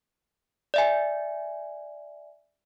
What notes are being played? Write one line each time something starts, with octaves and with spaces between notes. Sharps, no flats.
D5 E5 G#5